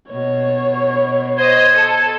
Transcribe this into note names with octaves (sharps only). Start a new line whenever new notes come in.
B2 C#5
C5 D#5 G#6
A4